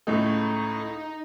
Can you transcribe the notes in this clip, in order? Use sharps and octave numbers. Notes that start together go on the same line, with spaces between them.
C#2 A2 A3 D#4